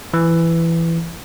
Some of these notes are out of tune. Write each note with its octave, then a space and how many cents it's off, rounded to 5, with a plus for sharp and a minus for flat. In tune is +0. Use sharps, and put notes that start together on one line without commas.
E3 +15